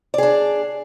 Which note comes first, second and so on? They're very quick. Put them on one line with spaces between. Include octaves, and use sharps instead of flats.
D5 G#4 D4